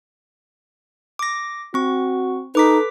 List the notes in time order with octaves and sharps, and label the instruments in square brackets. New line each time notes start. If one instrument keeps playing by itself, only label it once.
[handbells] D6 A#6
[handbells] C4 C#6 [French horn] F#4
[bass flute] D#4 [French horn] A4 [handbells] B4 D6 B6